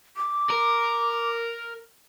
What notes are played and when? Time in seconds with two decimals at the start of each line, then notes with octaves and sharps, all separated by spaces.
0.17 D6
0.50 A#4